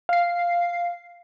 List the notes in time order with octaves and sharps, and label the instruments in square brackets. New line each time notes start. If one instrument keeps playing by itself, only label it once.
[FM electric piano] F5 C7